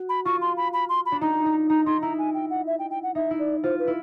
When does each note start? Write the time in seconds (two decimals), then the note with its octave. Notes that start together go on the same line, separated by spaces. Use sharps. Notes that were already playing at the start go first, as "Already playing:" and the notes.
Already playing: F#4
0.09 B5
0.25 F4 C#6
0.41 C6
0.57 B5
0.73 B5
0.89 C6
1.06 B5
1.12 D4
1.21 D#4 A#5
1.46 D#4
1.70 D#4 A#5
1.86 D#4 C6
2.02 E4 A#5
2.19 G#5
2.34 G5
2.50 F#5
2.67 E5
2.79 G5
2.91 G5
3.03 F#5
3.15 D#4 E5
3.31 E4
3.39 D5
3.63 F4 C5
3.79 B4
3.87 E4